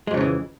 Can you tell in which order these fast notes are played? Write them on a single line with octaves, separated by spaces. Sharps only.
G#3 F2 C#3 F3 E3